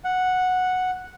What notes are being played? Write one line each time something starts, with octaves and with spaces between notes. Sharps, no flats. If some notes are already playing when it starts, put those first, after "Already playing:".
F#5